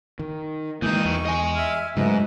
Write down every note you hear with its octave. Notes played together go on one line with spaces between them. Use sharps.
D#3
D#3 E3 G#3 A#3 D#4 D#6 G6
E2 C#6
D#5 G#5
E5 F6 G#6
G#2 C#3 F#3 A3 B4 D#5 E5